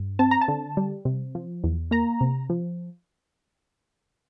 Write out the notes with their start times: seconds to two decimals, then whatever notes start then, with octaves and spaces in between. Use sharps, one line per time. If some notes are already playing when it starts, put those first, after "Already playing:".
Already playing: G2
0.19 C4 A5
0.31 A#5
0.41 A5
0.48 D3
0.77 G3
1.05 C3
1.35 F3
1.64 E2
1.91 A#3 A#5
2.21 C3
2.50 F3